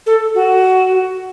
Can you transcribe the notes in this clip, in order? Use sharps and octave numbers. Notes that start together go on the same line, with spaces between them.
A4
F#4